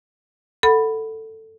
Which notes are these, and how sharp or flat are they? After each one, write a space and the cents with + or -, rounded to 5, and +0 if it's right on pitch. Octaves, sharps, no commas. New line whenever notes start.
A4 +10 F#5 +0 B5 +0